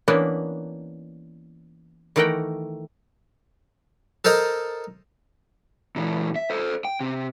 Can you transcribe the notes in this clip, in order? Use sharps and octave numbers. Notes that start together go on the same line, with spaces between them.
E3 A#3 B3 C#4 D4
D#3 E3 A3 A#4 F#5 G5
A4 A#4 C5 D#5 A#5
A#2 E3
E5
A4 C5
G5
C3